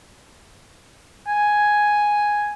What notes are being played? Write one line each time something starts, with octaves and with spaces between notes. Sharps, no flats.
G#5